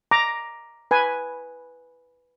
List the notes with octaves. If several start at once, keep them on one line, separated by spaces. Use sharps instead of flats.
A#5 D6
B4 G#5